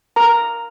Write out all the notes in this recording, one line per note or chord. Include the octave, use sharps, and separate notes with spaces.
A#4 A#5